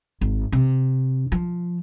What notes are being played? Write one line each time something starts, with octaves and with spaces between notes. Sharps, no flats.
G#1
C3
F3